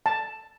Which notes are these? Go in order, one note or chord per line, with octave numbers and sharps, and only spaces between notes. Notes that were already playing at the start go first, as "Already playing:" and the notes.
A5